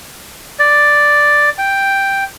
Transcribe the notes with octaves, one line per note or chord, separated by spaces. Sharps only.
D5
G5